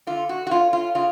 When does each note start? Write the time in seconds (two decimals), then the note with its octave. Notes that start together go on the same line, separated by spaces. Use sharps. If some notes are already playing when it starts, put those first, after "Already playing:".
0.07 D3 F4
0.29 F#4
0.47 F#4
0.51 C#4 F4
0.73 F4
0.95 C#3 F4